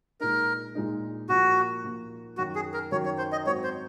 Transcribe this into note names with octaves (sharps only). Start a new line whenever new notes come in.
A#2 G#3 D#4 A#4
A#2 G#3 D#4
A#2 F3 A#3 F#4
A#2 F3 A#3
F#2 D#3 F#3 F#4
G#4
A#4
F#2 D#3 F#3 C#5
C#5
C5
D#5
G#2 F#3 C4 F#4 C#5
C5